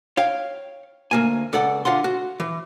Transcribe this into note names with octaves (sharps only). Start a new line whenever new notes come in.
C#5 F5 G5
D2 A#3 G#5
C#2 A4 D5 F#5
D3 F4 F#5 C6
F#4
E3